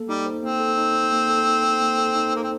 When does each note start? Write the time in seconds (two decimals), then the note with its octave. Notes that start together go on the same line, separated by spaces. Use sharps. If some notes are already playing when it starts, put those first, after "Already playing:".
Already playing: A#3 A4
0.08 G3 D#4
0.26 C5
0.43 A#3 C4
0.60 A4
0.77 D#4
0.95 C5
1.12 A#3
1.30 A4
1.47 D#4
1.64 C5
1.81 A#3
1.98 A4
2.16 D#4
2.33 A#3 C5
2.43 C4